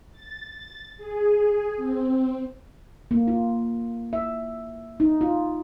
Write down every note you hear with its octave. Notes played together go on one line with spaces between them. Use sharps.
A6
A6
G#4
C4
A#3
F4
E5
D#4
F4